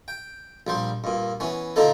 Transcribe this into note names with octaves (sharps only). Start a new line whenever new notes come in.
G5
A#1 G3 C5
G2 A#2
E3 B3 C#4
A#2 D3 A#3 D#4 A4